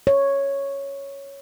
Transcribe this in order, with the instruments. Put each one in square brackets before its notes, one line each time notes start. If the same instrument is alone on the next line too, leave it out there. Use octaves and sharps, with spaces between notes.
[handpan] C#5